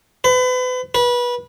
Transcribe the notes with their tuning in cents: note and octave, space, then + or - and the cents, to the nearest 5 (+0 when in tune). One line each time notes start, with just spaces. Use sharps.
B4 +35
B4 -25